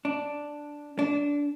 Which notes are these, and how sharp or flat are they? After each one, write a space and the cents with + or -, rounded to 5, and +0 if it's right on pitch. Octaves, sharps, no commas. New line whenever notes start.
D4 +0
D4 -20